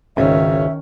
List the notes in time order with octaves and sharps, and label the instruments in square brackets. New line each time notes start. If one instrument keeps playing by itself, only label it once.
[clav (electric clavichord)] G#1 C#2 [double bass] D#3 C#4 [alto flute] E5